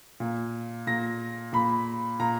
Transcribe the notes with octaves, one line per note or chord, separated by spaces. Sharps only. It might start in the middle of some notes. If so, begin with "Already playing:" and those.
A#2
A#2 A#6
A#2 B5
A#2 A#5